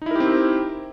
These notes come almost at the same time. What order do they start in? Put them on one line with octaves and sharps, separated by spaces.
D#4 E4 A#4 G4 C4